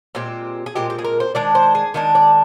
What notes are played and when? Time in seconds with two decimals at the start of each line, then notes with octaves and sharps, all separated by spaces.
0.15 A#2 G#3 C4 G4
0.66 G#4
0.75 A#2 G#3 C4 G4
0.90 G4
0.99 G#4
1.05 A#4
1.20 C5
1.35 D#3 G#3 D4 D5
1.55 C5
1.75 G#4
1.94 D#3 G#3 D4 D#5
2.15 D5